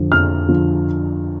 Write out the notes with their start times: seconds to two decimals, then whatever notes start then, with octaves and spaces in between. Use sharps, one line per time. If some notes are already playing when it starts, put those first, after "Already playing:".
Already playing: F2 D3 F3
0.12 F2 F6
0.48 D3 F3